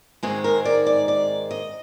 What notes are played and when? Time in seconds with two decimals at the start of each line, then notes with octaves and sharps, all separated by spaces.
0.23 G#2 D#3 G#3 C4 G#4
0.44 A#4
0.65 D5
0.87 D5
1.08 D5
1.51 D#5